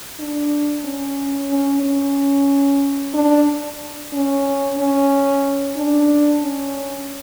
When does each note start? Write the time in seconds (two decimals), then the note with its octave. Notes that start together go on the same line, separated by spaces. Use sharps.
0.19 D4
0.84 C#4
1.50 C#4
1.83 C#4
3.14 D4
4.13 C#4
4.78 C#4
5.76 D4
6.43 C#4